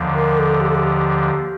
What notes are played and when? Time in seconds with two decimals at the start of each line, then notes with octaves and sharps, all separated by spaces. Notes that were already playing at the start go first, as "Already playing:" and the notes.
Already playing: D#2 D3 F3
0.14 A#4
0.38 A4
0.61 G4
0.68 A4
0.75 G4